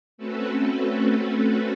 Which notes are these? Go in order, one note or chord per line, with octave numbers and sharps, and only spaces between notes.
A3 C4 C#4 F#4 A4 B4